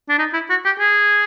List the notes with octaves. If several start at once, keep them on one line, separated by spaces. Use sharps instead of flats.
D4
D#4
E4
F#4
G4
G#4